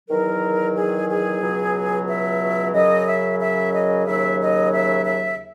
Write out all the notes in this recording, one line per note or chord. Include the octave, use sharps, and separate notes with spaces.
E2 D#3 F#3 A#4
G#4
G#4
C#2 B2 F#3
E5
F#2 C#3 F#3 D#5
E5
E5
D#5
D#2 C#3 F#3 E5
D#5
E5
E5